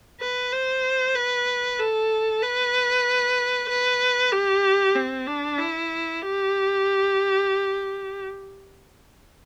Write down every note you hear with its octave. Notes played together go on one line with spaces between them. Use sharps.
B4
C5
B4
A4
B4
B4
G4
C4
D4
E4
G4